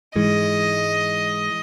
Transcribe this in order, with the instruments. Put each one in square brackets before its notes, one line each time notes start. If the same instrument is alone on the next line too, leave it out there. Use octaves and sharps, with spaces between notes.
[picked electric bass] G#2 E3 G#3 [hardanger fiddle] D#5